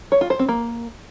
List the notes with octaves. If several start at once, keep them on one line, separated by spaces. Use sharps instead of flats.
C#5
F4
C5
C4
A#3